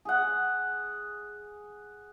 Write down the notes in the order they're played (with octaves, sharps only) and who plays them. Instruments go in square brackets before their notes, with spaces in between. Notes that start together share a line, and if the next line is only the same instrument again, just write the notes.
[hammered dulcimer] G#4 F#5